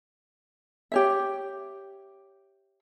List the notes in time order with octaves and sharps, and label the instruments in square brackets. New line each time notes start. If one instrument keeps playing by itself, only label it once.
[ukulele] G4 C#5 E5